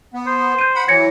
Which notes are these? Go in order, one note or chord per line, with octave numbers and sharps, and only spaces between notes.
B3
C5
G6 D#7
F#5 B5
E3 F#3 G#6 A#6 C#7